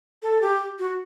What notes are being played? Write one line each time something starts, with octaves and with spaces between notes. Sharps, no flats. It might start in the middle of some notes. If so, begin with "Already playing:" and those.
A4
G4
F#4